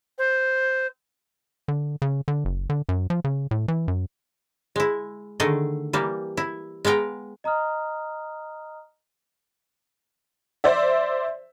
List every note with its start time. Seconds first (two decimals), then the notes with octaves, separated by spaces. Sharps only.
0.18 C5
1.68 D3
2.02 C#3
2.28 D3
2.45 F#1
2.70 D3
2.89 F#2
3.10 F3
3.24 C#3
3.51 A2
3.68 E3
3.88 F#2
4.76 G#3 E4
5.40 D3 D#3 A3 G#4 D#5
5.93 E3 G3 A#3
6.37 E4
6.85 G#3 B3 F5 G5 A#5
7.44 D#5 A#5 D#6 F6
10.64 C5 D5 E5